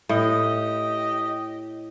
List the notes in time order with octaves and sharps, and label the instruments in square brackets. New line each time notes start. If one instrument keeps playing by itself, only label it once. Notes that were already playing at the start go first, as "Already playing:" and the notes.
[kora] A2 [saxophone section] G4 D#5